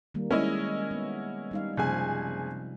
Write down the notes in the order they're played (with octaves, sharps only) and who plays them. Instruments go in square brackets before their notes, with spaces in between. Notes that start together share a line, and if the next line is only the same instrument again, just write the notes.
[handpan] D#3 G3 A#3
[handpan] G#3 [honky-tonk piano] C#4 E4 D#5
[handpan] B3
G3 D#4 F5
[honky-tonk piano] F#1 G#4 G#5 [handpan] C3 F3 C4